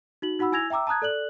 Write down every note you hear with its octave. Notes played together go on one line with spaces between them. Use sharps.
D#4 F#4 F#7
D#4 F#4 F#5 B5 E6
E4 G#5 E6 G#6 A#6 F7
E5 G5 A#5 D6 E6
A5 A#5 D#6 F#6 G#6
A4 D5 F#6 F#7